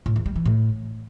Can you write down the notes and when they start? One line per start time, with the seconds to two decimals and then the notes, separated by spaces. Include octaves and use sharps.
0.06 A2
0.16 E2
0.26 G3
0.36 E3
0.46 A2